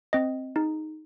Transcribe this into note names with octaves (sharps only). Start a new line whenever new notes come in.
C4 D#5
D#4 G#4